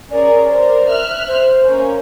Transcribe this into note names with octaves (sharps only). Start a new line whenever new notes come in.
C#4 G#4 A#4 D5
A#4 C5
E5 F6 F#6
C5
A#3 C#4